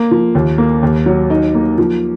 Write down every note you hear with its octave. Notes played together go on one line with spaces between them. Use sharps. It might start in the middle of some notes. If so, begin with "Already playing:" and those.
Already playing: A#3
F3
D#2
A#3
D#2
F#3
D#4
A#3
F3